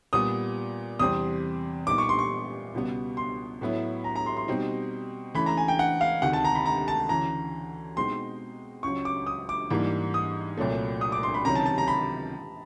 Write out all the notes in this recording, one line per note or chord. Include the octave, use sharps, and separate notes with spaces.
A#2 G3 B3 D#6
E2 C3 E3 G3 C4 D#6
A#2 G3 B3 D#4 D6
C#6
C6
C#6
C#2 B2 G3 B3
C6
A2 F#3 B3 E4
A#5
A#5
C6
C6
B2 G3 C4 D#4
C#3 E3 A3 B5
A#5
G#5
G5
F#5
F5
D2 C3 D#3 F#5
A5
A#5
B5
A#5
A5
D2 C#3 E3 A#5
B2 G#3 C4 D#4 C6
C#2 C#3 F#3 C#6
D6
D#6
D6
G#2 E3 G3 A#3 D4
D#6
C2 A#2 F#3 A3
D#6
D6
C6
B5
C#2 C3 D#3 F#3 A#5
A5
A5
A#5
B5